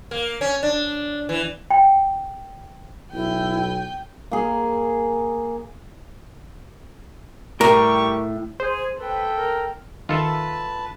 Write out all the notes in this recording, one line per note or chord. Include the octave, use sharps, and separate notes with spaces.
A#3
C#4
D4
E3
G5
B1 E4 G5 G#5 G6
A#3 G#4
A2 G3 G4 A#4 C#6
G#4 C5
A4 B4 G5
A#4
D#3 F4 A4 B4 E5 A5